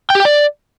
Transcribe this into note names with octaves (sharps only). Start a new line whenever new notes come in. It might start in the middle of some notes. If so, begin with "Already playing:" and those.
G5
G4
G5
D5